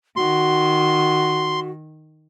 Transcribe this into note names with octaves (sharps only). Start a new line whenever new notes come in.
D#3 F#4 C6